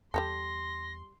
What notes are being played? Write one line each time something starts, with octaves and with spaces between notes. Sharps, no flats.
E2 G3 G4 A4 C6 A#6